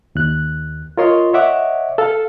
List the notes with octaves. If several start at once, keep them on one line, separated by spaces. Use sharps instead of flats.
D#2 F#6
F4 A#4 C#5 D#5 C6
C#5 D#5 E5 F#5 D6
A4 F5